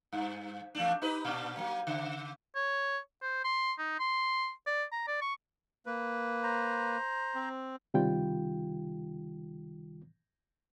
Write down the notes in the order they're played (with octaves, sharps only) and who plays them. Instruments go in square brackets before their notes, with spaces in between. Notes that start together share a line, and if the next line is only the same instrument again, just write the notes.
[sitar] G2
E2 A3 D4
D#4 G4 B4
A#2 D4
F#3 A#3
C#3
[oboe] C#5
C5
C6
D#4
C6
D5
A#5
D5
C#6
[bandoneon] A#3 B4
[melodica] C5 A#5
[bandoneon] C4
[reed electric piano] C#2 C3 D#3 G3 F4 G5